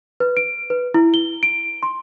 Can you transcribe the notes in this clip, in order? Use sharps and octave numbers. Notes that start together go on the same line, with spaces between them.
B4
D7
B4
E4
G7
D7
C6